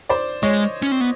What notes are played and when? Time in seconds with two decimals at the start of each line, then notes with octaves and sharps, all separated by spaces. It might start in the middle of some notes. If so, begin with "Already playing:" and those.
0.09 C5 D5
0.43 G#3 C#5 D#5
0.82 C#4
0.92 C4
1.01 B3